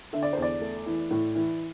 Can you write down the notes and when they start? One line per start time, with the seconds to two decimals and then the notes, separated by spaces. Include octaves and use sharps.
0.13 D3 E5
0.23 D5
0.33 E2 C5
0.42 D5
0.61 A3
0.86 E3
1.11 A2
1.35 E3